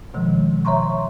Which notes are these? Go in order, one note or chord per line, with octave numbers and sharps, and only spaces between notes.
B2 D#3 F3 G#3
C#5 E5 A#5 C6 C#6